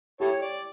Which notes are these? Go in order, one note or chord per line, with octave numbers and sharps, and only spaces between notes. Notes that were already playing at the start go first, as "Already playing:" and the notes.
E4 G4 A4 C#5
D5